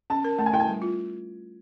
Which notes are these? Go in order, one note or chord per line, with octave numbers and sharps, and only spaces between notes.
C#4 A5
A#4
A3 A5
G#5
E4 G5
G#5
G3
F4